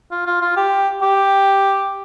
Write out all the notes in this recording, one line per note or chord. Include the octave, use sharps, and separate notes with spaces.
F4
F4
F4
G4
G4